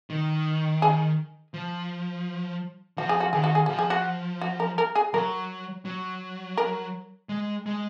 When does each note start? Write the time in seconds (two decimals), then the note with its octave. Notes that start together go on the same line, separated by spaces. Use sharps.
0.10 D#3
0.82 G#4
1.54 F3
2.98 F3 F#4
3.09 G#4
3.20 F#4
3.33 D#3 G#4
3.44 F#4
3.55 G#4
3.66 F3 F#4
3.79 G#4
3.90 F#4
4.41 F#4
4.60 A#4
4.78 A#4
4.95 G#4
5.14 F#3 A#4
5.85 F#3
6.57 A#4
7.29 G#3
7.66 G#3